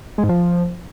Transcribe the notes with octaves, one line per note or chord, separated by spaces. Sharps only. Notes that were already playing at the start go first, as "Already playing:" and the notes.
G#3
G#2
F3